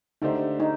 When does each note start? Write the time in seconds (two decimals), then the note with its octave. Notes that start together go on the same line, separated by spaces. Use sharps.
0.22 D3 A3 D4 D#4 G4 C5
0.60 D#4